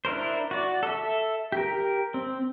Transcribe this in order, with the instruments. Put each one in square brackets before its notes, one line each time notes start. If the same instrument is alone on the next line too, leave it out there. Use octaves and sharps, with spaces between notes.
[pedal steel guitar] D4 E4 A#4 C5
F#4 D5
A4 E5
G4 A#4
C4